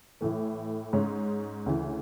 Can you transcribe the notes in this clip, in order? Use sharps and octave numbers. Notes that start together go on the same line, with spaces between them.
A2 E3 A3
G#2 G#3 C#4
D2 C#3 E3